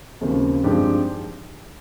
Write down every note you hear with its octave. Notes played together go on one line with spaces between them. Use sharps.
D#2 C#3 F3 C4
G2 F3 G#3 C4 D#4 G4